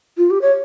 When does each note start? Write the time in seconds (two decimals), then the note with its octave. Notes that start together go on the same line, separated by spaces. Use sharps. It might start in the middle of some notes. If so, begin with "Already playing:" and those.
0.17 F4
0.30 G4
0.42 C#5